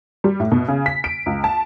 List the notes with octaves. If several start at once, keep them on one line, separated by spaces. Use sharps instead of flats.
G3
A2
B2
C#3
B6
D7
C#2
A5